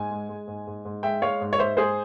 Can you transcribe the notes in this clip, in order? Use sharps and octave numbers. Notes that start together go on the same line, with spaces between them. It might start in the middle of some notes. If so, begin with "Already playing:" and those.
Already playing: G#2 G#5
G#3
G#3
G#2
G#2
G#2
G#3 E5 G5
G#3 C#5 F5
G#2
C#5
G#2 C5 E5
G#3 G#4 C5